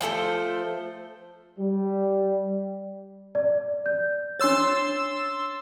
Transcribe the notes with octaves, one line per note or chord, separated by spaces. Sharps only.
F3 A3 A4 C5
G3
D5
G6
D4 C#5 C6 E6 A6